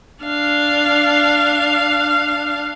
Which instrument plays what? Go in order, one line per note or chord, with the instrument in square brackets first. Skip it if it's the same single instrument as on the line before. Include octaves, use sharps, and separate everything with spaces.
[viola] D4 F5